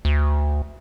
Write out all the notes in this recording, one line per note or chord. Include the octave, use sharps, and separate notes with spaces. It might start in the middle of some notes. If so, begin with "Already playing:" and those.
D2